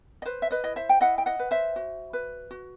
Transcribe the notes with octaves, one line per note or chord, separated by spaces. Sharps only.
D#5
B4 C5
E5
B4 D#5
E4 D#5
C5 E5
G5
E4 D#5 F#5
G5
D#5 F#5
B4
C5 E5
F#4
B4
F#4